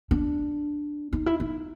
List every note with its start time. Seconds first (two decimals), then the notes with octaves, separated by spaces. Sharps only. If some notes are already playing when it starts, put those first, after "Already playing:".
0.11 D4
1.13 D#4
1.26 E4
1.40 D#4